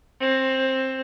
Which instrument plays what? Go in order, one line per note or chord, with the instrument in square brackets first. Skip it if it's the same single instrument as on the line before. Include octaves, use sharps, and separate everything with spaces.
[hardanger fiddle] C4